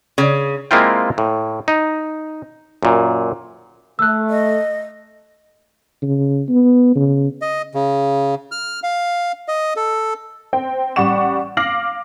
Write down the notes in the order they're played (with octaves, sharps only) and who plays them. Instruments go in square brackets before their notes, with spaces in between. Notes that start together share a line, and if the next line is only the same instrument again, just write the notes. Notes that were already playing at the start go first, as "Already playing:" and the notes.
[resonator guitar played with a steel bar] C#3
[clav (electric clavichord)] G#3 A#3 C4 E4 F4 G5
A2
D#4
F#2 A#2
[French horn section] A3 [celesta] E6 F#6
[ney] D#5
[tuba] C#3
B3
C#3
[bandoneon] D#5
C#3
F6
F5
D#5
A4
[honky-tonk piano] C4 G5
A1 G3 D5 F#5 C#6 E7
F5 D6 F6 A#6 C7 F#7